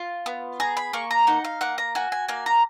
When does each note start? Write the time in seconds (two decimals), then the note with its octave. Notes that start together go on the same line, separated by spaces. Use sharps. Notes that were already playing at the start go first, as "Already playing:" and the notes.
Already playing: F4
0.26 B3
0.60 G#4 A#5
0.77 B5
0.93 A#3 C#6
1.11 A#5
1.27 D#4 F#5
1.45 F5
1.61 A#3 F#5
1.78 A#5
1.95 F#4 G#5
2.12 G#5
2.28 A#3 G#5
2.46 A#5